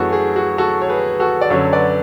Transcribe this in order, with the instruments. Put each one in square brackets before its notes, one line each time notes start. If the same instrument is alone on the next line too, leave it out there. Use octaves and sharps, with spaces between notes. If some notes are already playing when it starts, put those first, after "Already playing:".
Already playing: [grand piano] F#2 E3 A3 F#4 G#4 A4 B4
G#4
F#4
F#4 A4
C#5
G#4 B4
F#4 A4
D5
F#2 D3 F#3 C#4 A4 C#5
B4 D5